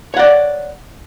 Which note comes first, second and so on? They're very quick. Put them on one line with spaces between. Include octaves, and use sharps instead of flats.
C#5 F#5 D5